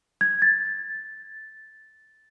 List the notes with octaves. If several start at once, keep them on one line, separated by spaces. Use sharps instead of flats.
G#6
A6